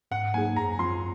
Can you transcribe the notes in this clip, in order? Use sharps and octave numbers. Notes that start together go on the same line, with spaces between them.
G#2 F#5
F#3 A#3 D#4 G#4 G#5
F#2 A#5
F3 G#3 C4 F4 C6